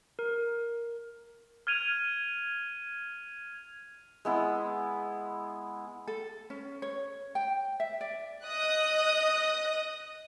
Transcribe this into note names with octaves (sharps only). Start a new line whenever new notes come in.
A#4
F6 G#6 D#7 F7
G#3 B3 E4
A4
C#4
C#5
G5
E5
D5
D#5 D#6 F#6